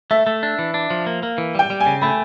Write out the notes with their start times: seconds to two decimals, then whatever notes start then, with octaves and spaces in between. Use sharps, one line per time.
0.11 A3 E5
0.27 A3
0.43 D4
0.59 E3
0.74 D4
0.90 F3
1.07 A#3
1.23 A#3
1.38 E3
1.55 G3 G5
1.70 G3
1.80 G#5
1.86 C#3
2.02 A3 B5